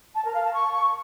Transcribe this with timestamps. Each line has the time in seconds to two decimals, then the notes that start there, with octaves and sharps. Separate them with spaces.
0.15 A5
0.24 A#4
0.34 F5
0.44 A5
0.53 C#6